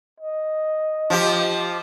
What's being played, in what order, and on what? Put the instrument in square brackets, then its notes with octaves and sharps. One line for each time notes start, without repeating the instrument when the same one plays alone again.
[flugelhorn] D#5
[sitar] F3 G4